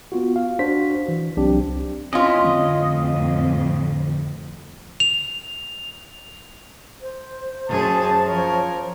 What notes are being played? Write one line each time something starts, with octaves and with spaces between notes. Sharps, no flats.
B3 F4 F#4
F5
D4 F#4 C5 B6
E3
C2 F#3 C4 D4 G4
C4 C#4 E4 F4 D#5
F2 A2 D3
F7
C5
F#2 G#4 A5
F3 A#4 C#5